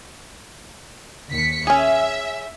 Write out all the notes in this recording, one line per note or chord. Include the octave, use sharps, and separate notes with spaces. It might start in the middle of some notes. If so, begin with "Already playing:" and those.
D#2 B6 C#7
C#4 G#4 E5